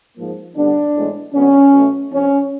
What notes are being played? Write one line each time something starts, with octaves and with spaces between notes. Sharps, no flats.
G#2 F3 A#3
D3 G3 B3 D4
A2 E3 G#3 B3
D3 F#3 B3 C#4
B2 F#3 A3
F2 C3 F3 C#4